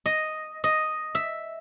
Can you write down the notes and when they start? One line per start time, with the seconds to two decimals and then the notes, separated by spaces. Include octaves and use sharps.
0.06 D#5
0.64 D#5
1.15 E5